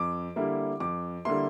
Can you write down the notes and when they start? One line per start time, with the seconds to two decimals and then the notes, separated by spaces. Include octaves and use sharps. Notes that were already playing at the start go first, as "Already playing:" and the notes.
Already playing: F2 D6
0.36 D3 G3 A#3 E4
0.80 F2 D6
1.25 D3 G3 A#3 E4 C6